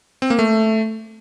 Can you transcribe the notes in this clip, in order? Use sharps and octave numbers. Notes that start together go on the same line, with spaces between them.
C4
A#3
A3